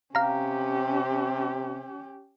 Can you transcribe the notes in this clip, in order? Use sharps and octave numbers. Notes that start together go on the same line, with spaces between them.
C3 C#4 G4 F5 A#5